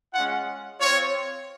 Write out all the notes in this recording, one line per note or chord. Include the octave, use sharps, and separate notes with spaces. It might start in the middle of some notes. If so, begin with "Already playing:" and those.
G#3 C#4 F4 F#5
C4 F4 C#5